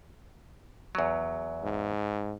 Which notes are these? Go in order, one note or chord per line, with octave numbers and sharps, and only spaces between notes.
E2 F#3
G#2